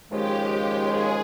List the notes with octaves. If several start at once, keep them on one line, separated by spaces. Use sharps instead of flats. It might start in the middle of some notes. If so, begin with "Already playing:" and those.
D#2 C#3 F3 G#3 G4
G#4